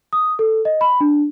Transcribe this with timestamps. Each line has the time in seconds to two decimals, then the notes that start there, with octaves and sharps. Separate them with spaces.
0.13 D#6
0.39 A4
0.65 D#5
0.81 B5
1.01 D4